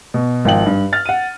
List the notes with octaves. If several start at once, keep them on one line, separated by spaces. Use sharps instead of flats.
B2
G#1 F3 G5 F#7
G2
F6 A6
F#5 D#7